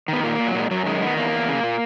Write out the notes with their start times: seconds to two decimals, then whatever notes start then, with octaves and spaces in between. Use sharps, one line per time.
0.08 D#3 B3
0.24 A#2 A#3
0.35 A#2 A#3
0.47 F#3
0.55 A#2 G#3
0.71 F#2 F#3
0.86 D#3 G#3
1.01 D#3 B3
1.17 E2 A#3
1.33 E2
1.48 C#3
1.63 A#2